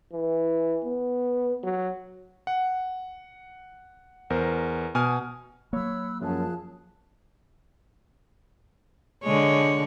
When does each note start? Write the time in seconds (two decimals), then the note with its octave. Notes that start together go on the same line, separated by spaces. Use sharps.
0.13 E3
0.85 B3
1.63 F#3
2.47 F#5
4.30 E2 A#4 C5
4.95 B2 G#5 D#6 F6
5.73 F#3 A#3 C#5 B5 E6 F#6
6.21 F#2 F3 G#4 A5 F#6
9.24 D3 G#3 C#5